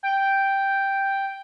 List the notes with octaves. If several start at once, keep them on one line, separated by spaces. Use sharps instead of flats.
G5